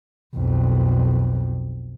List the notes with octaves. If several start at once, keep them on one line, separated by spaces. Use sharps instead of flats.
B1 F2